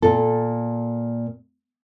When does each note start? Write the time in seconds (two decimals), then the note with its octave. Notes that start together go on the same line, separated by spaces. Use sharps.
0.02 A#2 A4